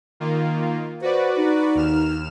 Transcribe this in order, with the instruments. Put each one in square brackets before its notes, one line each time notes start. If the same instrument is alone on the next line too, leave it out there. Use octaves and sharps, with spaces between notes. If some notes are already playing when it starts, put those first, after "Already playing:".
[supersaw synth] D#3 A#3 F4
[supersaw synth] F#4 B4 D5 [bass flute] C5
[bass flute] D#4
[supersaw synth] D#2 F6 E7